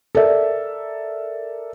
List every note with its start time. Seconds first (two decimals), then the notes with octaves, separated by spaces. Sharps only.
0.15 A4 A#4 D5 E5